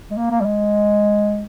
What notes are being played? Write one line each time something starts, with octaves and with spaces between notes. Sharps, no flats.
G#3
A#3
A#3
G3
G#3